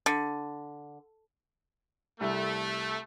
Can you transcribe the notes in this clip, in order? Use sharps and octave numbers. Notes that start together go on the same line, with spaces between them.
D3
C2 A3